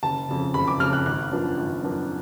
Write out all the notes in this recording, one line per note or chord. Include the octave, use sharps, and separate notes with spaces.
F#1 A5
F2 C#3
F#1 B5
D6
F2 C#3 F6
F#6
G#1 F#6
F#2 F3 B3 D4
G#1
F#2 F3 B3 D4